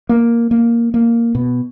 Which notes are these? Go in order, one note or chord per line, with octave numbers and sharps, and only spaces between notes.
A#3
A#3
A#3
B2